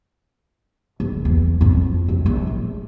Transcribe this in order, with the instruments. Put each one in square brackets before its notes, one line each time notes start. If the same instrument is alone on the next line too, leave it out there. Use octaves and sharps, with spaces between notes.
[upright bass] F#1
E2
F2 F4
F#2
A#1
A2